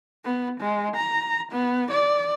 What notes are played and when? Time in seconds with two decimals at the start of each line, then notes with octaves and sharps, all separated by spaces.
0.25 B3
0.60 G#3
0.96 A#5
1.52 B3
1.91 D5